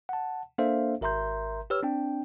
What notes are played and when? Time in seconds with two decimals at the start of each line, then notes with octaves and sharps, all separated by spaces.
0.09 F#5 A5
0.58 A#3 D4 A4 C5 E5 F5
1.01 G#1 A#4 E5 A#5 C6 G6
1.70 G4 B4 C#5 E6 F6
1.83 C4 D4 G5